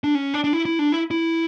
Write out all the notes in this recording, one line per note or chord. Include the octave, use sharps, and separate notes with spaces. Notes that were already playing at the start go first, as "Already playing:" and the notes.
D4
C#4
D4
D4
E4
E4
D4
E4
E4